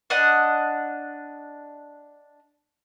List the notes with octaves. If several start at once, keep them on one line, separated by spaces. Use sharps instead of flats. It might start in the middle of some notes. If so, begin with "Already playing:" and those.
D4 D#5 F#5